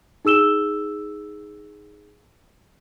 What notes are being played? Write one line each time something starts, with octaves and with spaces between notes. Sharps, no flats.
D#4 G#4 E6 E7 G7